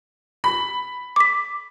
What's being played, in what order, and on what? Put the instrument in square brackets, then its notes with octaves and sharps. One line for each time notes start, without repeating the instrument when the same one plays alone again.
[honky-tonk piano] B5
[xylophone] D6 B6